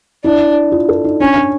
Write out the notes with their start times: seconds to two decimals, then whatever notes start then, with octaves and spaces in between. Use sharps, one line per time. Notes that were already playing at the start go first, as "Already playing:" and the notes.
0.24 D4 E4
0.72 F4
0.89 A4
1.04 D#4
1.20 C#4 D4
1.36 C#4